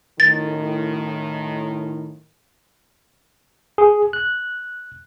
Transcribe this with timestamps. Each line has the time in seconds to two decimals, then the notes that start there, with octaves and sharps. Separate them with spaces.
0.20 F#2 A2 D#3 A6
3.78 G#4
4.13 F#6